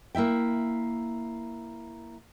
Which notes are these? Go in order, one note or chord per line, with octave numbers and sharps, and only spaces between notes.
A#3 E4 E5 G5